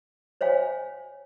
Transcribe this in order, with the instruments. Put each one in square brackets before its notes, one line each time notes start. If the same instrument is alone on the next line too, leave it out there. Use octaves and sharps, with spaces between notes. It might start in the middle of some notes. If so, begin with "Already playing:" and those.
[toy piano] C5 C#5 F5 G#5